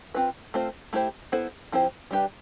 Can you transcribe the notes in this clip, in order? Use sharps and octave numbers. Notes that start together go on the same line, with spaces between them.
C4 F4 B4
A3 C4 F4 C5
A3 E4 G4 C5
B3 E4 A4 C5
F3 C4 E4 G4 C5
G3 D4 G4 B4